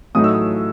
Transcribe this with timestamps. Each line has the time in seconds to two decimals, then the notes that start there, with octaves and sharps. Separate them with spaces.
0.15 A2 F#3 A3 D#4 D#6
0.24 E6
0.34 D#6